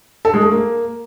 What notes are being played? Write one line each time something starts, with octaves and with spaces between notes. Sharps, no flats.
A4
G#3
A3
A#3